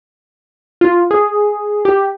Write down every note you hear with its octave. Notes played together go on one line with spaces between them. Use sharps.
F4
G#4
G4